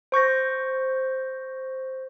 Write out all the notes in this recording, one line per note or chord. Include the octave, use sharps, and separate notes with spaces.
C5 C#6 G6 A#6